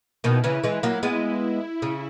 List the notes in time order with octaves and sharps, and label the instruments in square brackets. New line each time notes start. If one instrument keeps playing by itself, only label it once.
[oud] B2 D#3 [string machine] E4
[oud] C#3 E3
E3 G#3
F#3 A#3
G#3 B3
C#3